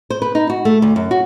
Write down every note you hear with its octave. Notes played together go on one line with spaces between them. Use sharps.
C5
B4
D#4
F#4
A3
D2
F#2
F#4